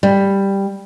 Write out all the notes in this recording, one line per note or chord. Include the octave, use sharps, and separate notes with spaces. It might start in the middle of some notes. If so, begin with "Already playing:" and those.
G3